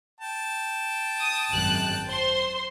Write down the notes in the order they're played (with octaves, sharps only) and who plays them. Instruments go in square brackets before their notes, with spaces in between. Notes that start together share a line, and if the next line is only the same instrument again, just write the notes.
[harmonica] G5 A5
[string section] D#6
G#1 F#2 F#6
C5 C6